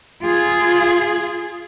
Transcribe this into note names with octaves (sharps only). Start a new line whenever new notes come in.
F4 G#4